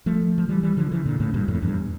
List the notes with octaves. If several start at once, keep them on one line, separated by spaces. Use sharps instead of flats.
F3 A3
F3
E3 G3
E3 G3
D3 F3
C#3 E3
A#2 D3
A2 C#3
G2 A#2
F2 A2
E2 G2